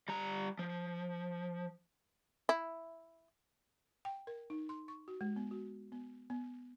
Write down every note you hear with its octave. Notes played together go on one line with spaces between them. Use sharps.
G3 A#5
F3
E4
G5
A#4
D#4
C6
C#6
F#4
G#3
B3
F#4
B3
B3